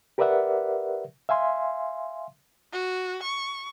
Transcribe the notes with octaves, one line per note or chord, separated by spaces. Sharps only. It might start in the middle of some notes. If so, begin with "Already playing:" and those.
G4 A#4 B4 D5 E5 F#5
E5 F5 G#5 C6
F#4
C#6